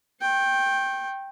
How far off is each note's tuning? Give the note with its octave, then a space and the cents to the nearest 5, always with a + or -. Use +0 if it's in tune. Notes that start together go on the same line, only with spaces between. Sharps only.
G5 +0 C#6 -40